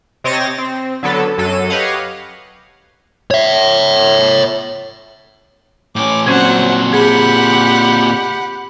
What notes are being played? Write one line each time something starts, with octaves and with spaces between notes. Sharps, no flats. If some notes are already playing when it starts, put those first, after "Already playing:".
C3 C4 C#5 D#5 A6 A#6
C4
D3 F#3 B3 A4
F#2 F#3 A4 D#7
G4 B4 C#5 D#5 F5 F#5
C#5 E5
A2 C#4 D6
A#2 F#3 C4 C#4 C5 F#5 G#6
G4 G#4 F#5 B5